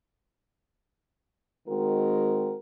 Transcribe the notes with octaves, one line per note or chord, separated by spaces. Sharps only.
D#3 G#3 C4 F#4 A#4